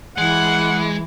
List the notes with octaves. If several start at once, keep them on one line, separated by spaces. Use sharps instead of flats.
E3 G#3 F#5